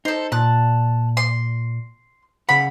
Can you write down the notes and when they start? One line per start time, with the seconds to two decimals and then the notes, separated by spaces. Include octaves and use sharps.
0.05 D#4 A4 C5
0.32 A#2 A5 F#6
1.17 C6
2.49 C#3 F#5 B5